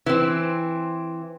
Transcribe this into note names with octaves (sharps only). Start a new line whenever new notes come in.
E3 C4